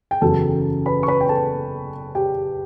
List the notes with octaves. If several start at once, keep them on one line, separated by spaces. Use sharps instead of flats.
G5
F#1 E2 C#3 F#3 A4 A5
B4 B5
C#6
B4 B5
G5
A4 A5
G4 G5